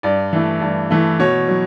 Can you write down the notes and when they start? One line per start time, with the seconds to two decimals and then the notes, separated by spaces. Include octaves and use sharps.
0.03 G2 D5
0.33 E3 A3
0.62 G2
0.91 E3 A3
1.19 B2 C#5
1.48 F#3